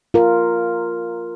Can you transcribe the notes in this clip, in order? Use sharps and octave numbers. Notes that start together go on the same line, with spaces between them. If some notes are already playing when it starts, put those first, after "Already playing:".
F4 A#4